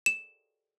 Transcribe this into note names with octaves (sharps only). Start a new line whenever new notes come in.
E7